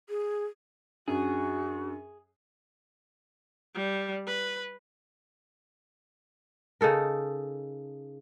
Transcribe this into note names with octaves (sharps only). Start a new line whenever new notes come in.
G#4
F#2 D4 F#4 G#4
G3
B4
C#3 D#4 A4 A#4